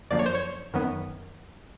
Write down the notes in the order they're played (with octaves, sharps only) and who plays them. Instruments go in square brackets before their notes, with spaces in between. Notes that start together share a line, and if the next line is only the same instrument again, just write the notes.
[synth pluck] F#2 D3 F3 A#3 D5
C#5
C5
C#5
F#2 D#3 F#3 B3